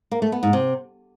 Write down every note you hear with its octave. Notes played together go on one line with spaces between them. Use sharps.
A#3
A3
B3
G#2
C3